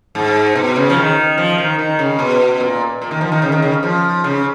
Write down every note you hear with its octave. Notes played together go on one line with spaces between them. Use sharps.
G#2
B2
C#3
F3
D#3
F3
D#3
D#3
C#3
B2
A#2
A#2
D#3
F3
D#3
C#3
D#3
C#3
F3
C#3